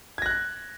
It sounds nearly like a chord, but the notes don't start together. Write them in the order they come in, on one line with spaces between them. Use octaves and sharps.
G#6 A#6 F#6